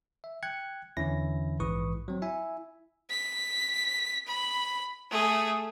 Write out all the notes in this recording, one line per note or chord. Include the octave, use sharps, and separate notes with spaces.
E5
G5 F#6 G#6 C#7
E2 D3 E3 C#4 E4 A#6
A#1 G#2 E3 B4 C#6 D#6
F#3 C4
E4 E5 G#5
B6
B5
A3 G#4